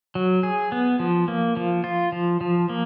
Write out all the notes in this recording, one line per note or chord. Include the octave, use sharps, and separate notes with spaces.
F#3
G#4
B3
F3
A#3
F3
F4
F3
F3
A#3